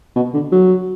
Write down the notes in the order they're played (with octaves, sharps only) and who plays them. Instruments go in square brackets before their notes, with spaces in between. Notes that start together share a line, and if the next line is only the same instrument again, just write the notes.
[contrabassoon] B2
D3
F#3